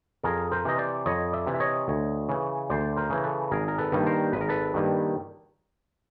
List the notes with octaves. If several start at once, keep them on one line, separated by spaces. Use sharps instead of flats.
F2 G#4 A#4
A#4 C5
C3 E3 D#5
C5 D5
F2 C#5 D#5
D5 E5
C3 E3
E5
C#5 D#5
D2
C#3 E3
D2 C5 D5
A#4 C5
C#3 E3
A4 B4
G#1 G#4 A#4
A#4
A4 B4
G2 D#3 G3 A#3
A#4 C5
G#1 B4
A#4
A4 B4
G2 D#3 G3 A#3